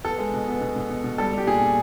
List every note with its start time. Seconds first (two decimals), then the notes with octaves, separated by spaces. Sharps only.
0.05 B3 A4
0.18 G#3
0.34 B2
0.48 B3
0.61 B2
0.76 B2
0.90 B2
1.04 B2
1.18 G3 A4
1.33 G3 G4
1.47 A#2 G#4
1.61 A#2